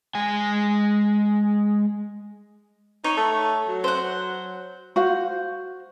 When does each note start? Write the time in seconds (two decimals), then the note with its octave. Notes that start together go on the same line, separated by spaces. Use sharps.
0.15 G#3 G#5
3.04 D#4 C#5
3.17 A3
3.68 F#3
3.84 C5 F#5
4.96 F#4 C5 F5